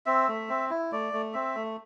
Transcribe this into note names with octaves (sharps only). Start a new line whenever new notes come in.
C4 E5
A3
C4
E4
A3 D5
A3
C4 E5
A3